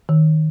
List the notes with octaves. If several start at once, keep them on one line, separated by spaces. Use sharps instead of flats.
D#3